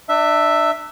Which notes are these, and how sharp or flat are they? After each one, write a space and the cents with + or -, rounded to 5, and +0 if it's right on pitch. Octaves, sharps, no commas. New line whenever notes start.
D4 +35 E5 +0